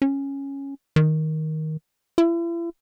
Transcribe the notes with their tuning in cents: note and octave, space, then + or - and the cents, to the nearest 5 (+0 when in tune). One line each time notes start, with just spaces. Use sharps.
C#4 -5
D#3 +10
E4 +40